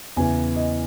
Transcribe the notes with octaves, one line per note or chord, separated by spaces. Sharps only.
E2 C#3 E3 G#5
D#5